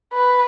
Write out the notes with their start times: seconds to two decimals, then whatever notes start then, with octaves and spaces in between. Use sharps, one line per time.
0.13 B4